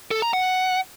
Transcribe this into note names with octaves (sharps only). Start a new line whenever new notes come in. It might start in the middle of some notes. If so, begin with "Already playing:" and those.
A4
A#5
F#5